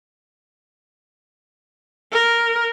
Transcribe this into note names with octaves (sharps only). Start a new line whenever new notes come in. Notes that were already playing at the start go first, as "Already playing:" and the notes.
A#4